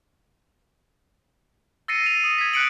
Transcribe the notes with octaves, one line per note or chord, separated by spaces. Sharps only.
E6 A6 A#6 C7 C#7 D#7
D#7 F7
D#6
G#6 B6
F#6 B6 C#7 D7 F#7